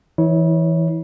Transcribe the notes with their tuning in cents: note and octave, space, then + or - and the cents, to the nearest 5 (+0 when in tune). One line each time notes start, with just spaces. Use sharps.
E3 +0 E4 -35 C#5 +0